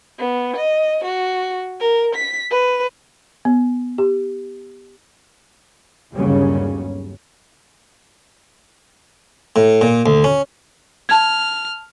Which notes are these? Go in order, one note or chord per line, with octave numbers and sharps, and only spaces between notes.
B3
D#5
F#4
A#4
B6
B4
B3
G4
G1 D#2 C#3 F#3 G3 C#4
A2
A#2
D2
C#4
A5 F6 G#6